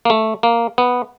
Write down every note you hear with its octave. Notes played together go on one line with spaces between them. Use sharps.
A#3
A3
A#3
B3